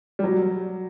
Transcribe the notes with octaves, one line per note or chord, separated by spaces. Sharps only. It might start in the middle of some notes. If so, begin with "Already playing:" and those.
G3
F#3